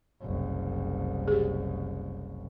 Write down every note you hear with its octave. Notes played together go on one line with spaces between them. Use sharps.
F#1 C2
G4 G#4